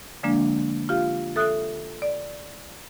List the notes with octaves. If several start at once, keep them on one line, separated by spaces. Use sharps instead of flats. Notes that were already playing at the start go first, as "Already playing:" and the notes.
D3 F3 G#3 A#3 D4
F4 G4 F5
A4 E5 D#6 F#6
D5